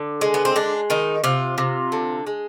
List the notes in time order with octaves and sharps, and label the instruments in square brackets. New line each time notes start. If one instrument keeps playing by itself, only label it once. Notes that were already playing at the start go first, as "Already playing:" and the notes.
Already playing: [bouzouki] D3
G#3
B3
C4
G#3 D4
D#3 D#4
C3 F4
C3
D3
G#3